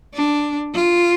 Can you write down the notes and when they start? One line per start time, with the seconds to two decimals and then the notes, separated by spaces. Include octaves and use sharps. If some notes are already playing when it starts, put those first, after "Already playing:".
0.14 D4
0.74 F4